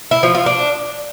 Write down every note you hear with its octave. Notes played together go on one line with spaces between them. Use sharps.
E4
F3
F4
D4